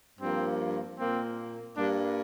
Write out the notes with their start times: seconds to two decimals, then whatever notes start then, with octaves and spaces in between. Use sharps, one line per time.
0.20 G2 F3 A#3 C4
0.98 A#2 A#3 C4
1.75 G2 G3 A#3 D4